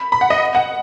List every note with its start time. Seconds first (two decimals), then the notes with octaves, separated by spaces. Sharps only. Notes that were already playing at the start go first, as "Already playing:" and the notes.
Already playing: B5
0.12 B5
0.21 F#5
0.30 D#5
0.55 F#5